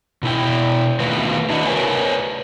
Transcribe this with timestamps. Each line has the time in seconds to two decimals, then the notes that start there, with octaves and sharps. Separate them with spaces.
0.23 B2 E4 G5
1.00 D#3 A3 B3 F4 F#4 B4
1.50 D4 E4 F#4 D#5
1.67 A#4 B4 C#5 G#5